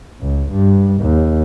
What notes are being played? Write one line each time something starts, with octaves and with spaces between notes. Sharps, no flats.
C#2
G2
D#2